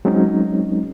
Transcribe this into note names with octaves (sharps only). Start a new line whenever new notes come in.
F#3 G#3 C4 C#4 D#4